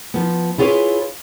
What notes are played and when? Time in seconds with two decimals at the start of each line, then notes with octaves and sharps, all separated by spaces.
0.14 F3 B3
0.58 E4 F4 G#4 B4 C#5